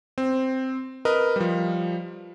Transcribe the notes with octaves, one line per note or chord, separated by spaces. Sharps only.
C4
A#4 B4 D#5
F3 G3